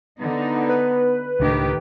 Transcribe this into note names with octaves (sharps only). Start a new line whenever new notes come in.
D3 B3 D#4
B4
C#2 A2 D#3 D4 G4